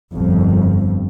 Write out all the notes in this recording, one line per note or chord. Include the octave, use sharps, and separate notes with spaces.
G1 F2